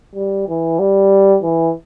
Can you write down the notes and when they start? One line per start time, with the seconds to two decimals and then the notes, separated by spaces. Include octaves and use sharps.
0.15 G3
0.48 E3
0.79 G3
1.43 E3